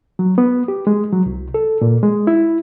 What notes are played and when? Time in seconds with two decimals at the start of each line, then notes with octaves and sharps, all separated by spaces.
0.19 F#3
0.38 B3
0.68 G4
0.87 G#3
1.13 F#3
1.26 C2
1.54 A4
1.81 A#2
2.03 G#3
2.27 E4